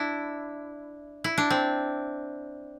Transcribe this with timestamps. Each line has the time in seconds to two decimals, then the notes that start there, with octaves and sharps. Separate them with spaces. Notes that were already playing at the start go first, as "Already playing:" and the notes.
Already playing: D4 E4
1.24 E4
1.38 D4
1.50 C4